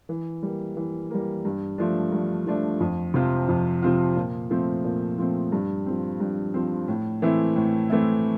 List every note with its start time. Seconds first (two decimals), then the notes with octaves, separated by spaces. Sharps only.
0.09 E3
0.43 G3 A#3
0.76 E3
1.10 G3 A#3
1.45 G2
1.78 F3 A3 D4
2.12 G2
2.47 F3 A3 D4
2.80 F2
3.14 C3 F3 C4 F4
3.48 F2
3.82 C3 F3 C4 F4
4.16 A#2
4.51 F3 A3 C4
4.84 A#2
5.18 F3 A3 C4
5.52 G2
5.86 F3 C4
6.20 G2
6.54 F3 C4
6.88 A2
7.22 E3 A3 C4 E4
7.56 A2
7.90 E3 A3 C4 E4